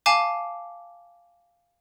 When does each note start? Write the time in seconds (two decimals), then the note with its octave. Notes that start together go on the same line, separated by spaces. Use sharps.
0.06 F5 G#5 A5 D6